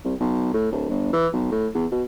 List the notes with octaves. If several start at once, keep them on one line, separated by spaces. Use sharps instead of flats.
C2
B1
A2
D1
G1
E3
B1
A2
E2
B2